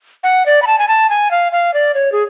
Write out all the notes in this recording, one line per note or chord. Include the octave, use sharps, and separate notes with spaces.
F#5
D5
B5
A5
G#5
A5
G#5
F5
F5
D5
C#5
G#4